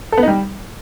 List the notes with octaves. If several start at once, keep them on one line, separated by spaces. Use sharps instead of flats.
A4
B3
D#4
G3